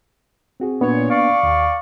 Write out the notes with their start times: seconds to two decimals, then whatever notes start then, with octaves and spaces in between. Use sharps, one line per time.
0.60 C4 F#4 G#4
0.81 A#2 A#3 B3 D4 C#5
1.10 D5 F5 C#6
1.43 D#2